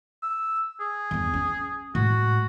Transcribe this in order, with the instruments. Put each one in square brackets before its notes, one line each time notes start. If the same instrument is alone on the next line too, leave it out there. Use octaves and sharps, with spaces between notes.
[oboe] E6
G#4
[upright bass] E2 G2
C#4
[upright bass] A2 G#3 [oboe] F#4